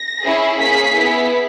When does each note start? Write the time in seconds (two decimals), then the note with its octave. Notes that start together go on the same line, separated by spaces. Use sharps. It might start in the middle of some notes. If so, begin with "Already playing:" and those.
Already playing: A#6
0.24 C#4 E4 G#4
0.59 A#3 C#4 G#4 B6
0.95 B3 E4 G#4